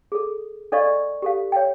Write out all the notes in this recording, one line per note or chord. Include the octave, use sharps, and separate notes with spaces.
G#4 A4
D4 A4 D5 D#5 F5 C#6
G4 A4 F5
C#5 F5 G5